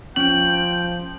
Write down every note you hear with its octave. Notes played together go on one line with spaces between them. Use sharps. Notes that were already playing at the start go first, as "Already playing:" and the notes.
F3 C#4 G5 F#7